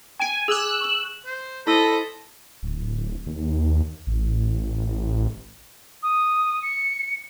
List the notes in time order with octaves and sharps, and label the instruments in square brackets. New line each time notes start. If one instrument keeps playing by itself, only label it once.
[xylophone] G5 D7 [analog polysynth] G#5
[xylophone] G#4 D6 [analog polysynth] E6 F#6
[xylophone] C#6 F#7
[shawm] C5
[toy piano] E4 E6 [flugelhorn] A4 [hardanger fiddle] C5 D#5 [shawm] B5
[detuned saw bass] D1
D#2
A1
[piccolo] D#6
C#7